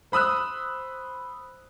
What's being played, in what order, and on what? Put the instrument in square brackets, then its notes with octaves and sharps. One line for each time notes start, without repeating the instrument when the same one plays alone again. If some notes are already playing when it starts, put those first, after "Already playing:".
[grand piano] C5 B5 D#6 E6 F#6